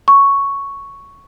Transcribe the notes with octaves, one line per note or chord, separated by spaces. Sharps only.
C#6